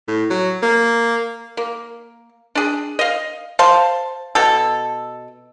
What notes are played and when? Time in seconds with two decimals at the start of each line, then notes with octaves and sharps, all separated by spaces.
0.08 A2
0.30 F#3
0.62 A#3
1.57 A#3
2.55 D4 G#4
2.99 D#5 F5
3.59 C5 F5 A5
4.35 B2 A4